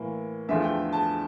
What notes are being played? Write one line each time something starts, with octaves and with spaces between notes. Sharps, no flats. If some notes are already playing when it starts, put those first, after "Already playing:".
Already playing: A2 E3 A#3
E2 D3 F3 A3 E5
G5
A5